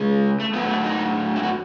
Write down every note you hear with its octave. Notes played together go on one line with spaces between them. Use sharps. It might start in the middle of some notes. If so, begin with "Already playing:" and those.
Already playing: C#3 G#3
A3
A2 F#3 A3 B3
A3
D#4
E4
F#4